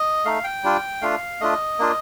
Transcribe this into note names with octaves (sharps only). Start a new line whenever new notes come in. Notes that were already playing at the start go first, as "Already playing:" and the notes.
Already playing: D#5
A3 D#4 F5
G5
G3 D4 F4
A3 D4 F4 F5
A3 D4 F4 D#5
A#3 D4 F4